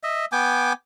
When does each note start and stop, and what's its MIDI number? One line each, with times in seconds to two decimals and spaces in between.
0.03 0.25 75
0.03 0.25 76
0.32 0.73 59
0.32 0.73 79
0.32 0.73 80
0.32 0.73 86